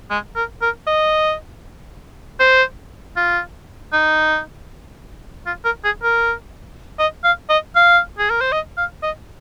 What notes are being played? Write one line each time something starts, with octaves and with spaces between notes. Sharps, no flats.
G#3
A#4
A#4
D#5
C5
F4
D#4
F4
A#4
G#4
A#4
D#5
F5
D#5
F5
G#4
A#4
C5
D#5
F5
D#5